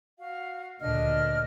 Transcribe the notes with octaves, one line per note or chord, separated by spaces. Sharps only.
F#4 F5
D2 A#2 D4 D#5 F6